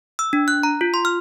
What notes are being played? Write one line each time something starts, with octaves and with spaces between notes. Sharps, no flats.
E6
D4
F#6
A#5
F4
C6
F6